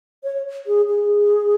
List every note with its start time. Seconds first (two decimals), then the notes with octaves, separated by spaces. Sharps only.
0.24 C#5
0.67 G#4
0.89 G#4